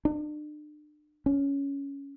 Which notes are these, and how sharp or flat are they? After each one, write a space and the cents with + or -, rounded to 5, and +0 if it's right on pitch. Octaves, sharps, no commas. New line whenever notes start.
D4 +40
C#4 +10